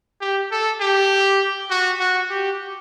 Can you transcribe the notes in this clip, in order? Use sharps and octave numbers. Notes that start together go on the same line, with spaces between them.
G4
A4
G4
F#4
F#4
G4